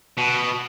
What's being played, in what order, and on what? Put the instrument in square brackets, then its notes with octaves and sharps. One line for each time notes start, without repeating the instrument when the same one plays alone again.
[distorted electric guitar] B2